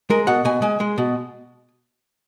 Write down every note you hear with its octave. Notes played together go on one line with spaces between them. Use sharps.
G#3 A#4
B2 F#5
B2 G#5
G#3 G#5
G#3
B2